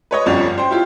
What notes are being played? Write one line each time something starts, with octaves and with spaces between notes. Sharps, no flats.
B4 C#5 D#5
G1 C2 F2 C#4 G4 D5
C5 G5
E4 F4 G4